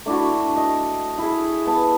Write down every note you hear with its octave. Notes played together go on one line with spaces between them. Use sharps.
A3 D4 E4 F#4
D#5
E4 G#4
B3 A5